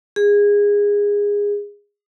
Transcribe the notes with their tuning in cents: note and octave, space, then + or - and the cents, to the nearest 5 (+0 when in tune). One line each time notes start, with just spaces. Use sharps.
G#4 -20